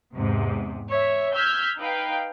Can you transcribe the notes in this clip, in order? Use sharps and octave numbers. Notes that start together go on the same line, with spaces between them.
E2 G#2 C3
C#5 E5
E6 F6 G6 G#6 B6
D#4 B4 F5 G5